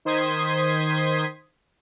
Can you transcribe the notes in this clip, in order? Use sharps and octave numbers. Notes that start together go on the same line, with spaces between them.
D#3 C5 C6 D#6 G#6 B6